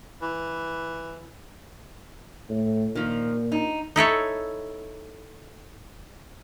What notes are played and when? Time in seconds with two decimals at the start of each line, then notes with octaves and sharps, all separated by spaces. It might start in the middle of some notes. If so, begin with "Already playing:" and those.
0.22 E3
2.50 A2
2.95 A#2 D#3 F3
3.52 D#4
3.96 D#4 E4 A4 C#5